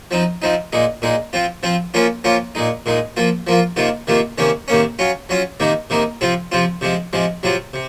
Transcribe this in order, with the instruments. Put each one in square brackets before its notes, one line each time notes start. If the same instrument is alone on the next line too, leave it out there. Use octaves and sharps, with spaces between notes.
[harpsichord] F3 C4 D#4
F3 C4 D#4
A#2 G#3 D#4
A#2 G#3 D#4
F3 C4 F4
F3 C4 F4
F3 A#3 C#4 F4
F3 A#3 C#4 F4
A#2 G#3 D#4
A#2 G#3 D#4
F3 A#3 F4
F3 A#3 F4
C3 D#3 A#3 F4
C3 D#3 A#3 F4
C3 D#3 A#3 C#4
C3 D#3 A#3 C#4
F#3 C#4 F4
F#3 C#4 F4
C3 D#3 A#3 D#4
C3 D#3 A#3 D#4
C3 F3 C4 F4
C3 F3 C4 F4
C3 F3 G#3
C3 F3 G#3
C3 F#3 C4 F4
C3